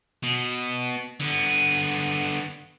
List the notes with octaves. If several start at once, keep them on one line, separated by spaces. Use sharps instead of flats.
B2
D3 B3